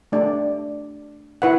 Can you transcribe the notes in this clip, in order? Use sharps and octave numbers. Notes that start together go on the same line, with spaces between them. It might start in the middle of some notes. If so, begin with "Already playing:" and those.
A3 D4 G4 D5
E4 B4 F#5